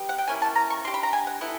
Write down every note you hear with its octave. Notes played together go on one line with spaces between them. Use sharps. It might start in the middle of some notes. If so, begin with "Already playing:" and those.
Already playing: B3 G4
F#5
G5
A#3 C#4 E4 G#5
A5
A#5
C#6
D4 G4 C6
B5
A#5
G#5
F#5
B3 E4 A4